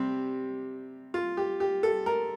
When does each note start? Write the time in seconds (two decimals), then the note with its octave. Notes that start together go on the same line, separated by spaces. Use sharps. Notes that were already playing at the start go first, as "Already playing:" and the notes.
Already playing: C3 G3 C4 G4
1.14 F4
1.37 G4
1.60 G4
1.83 A4
2.06 A#4